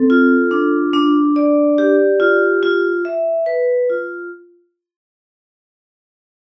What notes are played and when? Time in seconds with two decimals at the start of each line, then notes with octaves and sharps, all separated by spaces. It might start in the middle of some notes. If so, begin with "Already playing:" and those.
Already playing: C4 A4
0.10 F4
0.51 D4
0.93 D4
1.36 D5
1.78 G4
2.20 F4
2.63 F4
3.05 E5
3.46 B4
3.90 F4